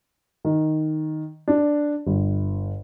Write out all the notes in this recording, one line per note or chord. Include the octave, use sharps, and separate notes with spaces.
D#3
D4
G1